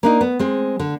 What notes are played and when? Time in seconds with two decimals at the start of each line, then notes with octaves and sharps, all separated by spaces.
0.03 A#3 D4 D#4
0.21 B3
0.39 G#3 C4
0.79 D3